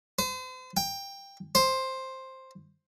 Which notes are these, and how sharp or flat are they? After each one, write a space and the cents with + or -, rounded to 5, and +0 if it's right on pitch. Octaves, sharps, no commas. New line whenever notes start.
C5 -40
G5 +15
C5 +5